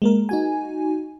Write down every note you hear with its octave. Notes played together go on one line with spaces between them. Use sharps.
G#3 A#3 A#4
D#4 F#4 G#5